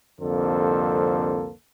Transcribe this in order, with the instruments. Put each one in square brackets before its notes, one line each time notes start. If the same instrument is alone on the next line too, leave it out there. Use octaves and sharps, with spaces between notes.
[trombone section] C2 F2 D3 A#3 A4 C5